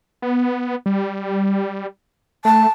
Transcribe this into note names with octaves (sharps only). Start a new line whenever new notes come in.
B3
G3
A3 A5